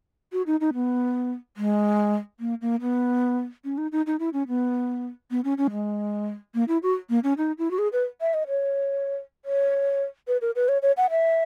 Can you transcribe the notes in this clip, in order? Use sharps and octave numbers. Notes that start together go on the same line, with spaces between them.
F#4
D#4
D#4
B3
G#3
A#3
A#3
B3
C#4
D#4
D#4
D#4
E4
C#4
B3
B3
C#4
C#4
G#3
A#3
E4
F#4
A#3
C#4
D#4
E4
F#4
G#4
B4
E5
D#5
C#5
C#5
B4
A#4
B4
C#5
C#5
F#5
E5